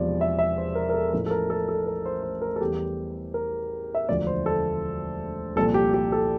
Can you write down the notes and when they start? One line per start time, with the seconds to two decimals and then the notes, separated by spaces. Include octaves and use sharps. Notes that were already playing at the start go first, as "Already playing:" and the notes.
Already playing: E1 E2 C3 F3 D5
0.21 E5
0.39 E5
0.58 C5
0.75 A#4
0.89 A#4
0.94 A4
1.13 A1 A2 F3 A#4
1.26 A4
1.31 A#4
1.50 A4
1.69 A4
1.87 A#4
2.06 C5
2.23 C5
2.42 A#4
2.56 A4
2.61 E2 E3 G3 G4
3.34 A#4
3.95 E5
4.09 E1 D2 D3 F3 D5
4.27 C5
4.46 A4
5.56 C2 A#2 F3 A4
5.74 G4
5.94 G4
6.12 A4